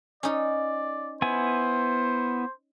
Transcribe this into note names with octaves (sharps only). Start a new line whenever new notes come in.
C#4 D#4 D5
B3 E4 C5 G#5